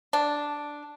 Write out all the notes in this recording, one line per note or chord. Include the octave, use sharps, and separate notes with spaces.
D4